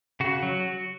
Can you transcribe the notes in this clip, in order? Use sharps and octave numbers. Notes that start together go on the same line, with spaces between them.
C#3 F#4
F#3